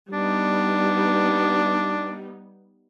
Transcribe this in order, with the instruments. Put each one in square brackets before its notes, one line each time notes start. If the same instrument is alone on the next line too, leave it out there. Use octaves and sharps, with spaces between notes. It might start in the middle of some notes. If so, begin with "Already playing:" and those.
[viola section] G3 B3 D#4 [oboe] D4